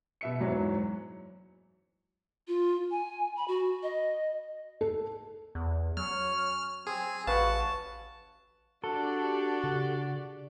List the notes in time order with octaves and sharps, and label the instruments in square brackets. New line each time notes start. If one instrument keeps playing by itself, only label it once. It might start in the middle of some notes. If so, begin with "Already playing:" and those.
[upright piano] B2 E5 C#7
F#1 E2 G#2 F#3 C#5
[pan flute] F4
G#5
B5
F#4
D#5
[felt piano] A4
[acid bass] E2
[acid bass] F#3 [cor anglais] C#4 [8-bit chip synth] F6
[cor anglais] C4 [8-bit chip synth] G#4 [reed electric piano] G#5
[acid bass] A1 [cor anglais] F#4 [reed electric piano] B4 F5 [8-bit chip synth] A5
[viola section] D4 G4 D5 [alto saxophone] F#4 [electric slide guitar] A4
[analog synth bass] C#3